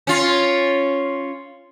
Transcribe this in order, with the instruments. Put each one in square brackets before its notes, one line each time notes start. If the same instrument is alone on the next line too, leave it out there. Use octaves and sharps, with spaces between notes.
[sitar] C#4 F4